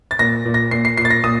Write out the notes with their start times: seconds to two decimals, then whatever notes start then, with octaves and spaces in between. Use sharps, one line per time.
0.11 A6
0.19 A#2 A#6
0.45 A#2
0.54 A#6
0.71 A#2 C7
0.85 C7
0.97 A#2 C7
1.05 A6
1.10 A#6
1.24 A#2 D#6